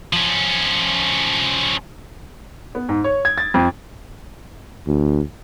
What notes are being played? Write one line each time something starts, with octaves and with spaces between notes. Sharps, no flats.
F3 C#4
B3
G#2
C#5
G#6
A6
F2
D2